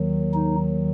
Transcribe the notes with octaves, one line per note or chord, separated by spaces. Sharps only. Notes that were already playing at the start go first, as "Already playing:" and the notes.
Already playing: D#2 D#3 F#3
D#4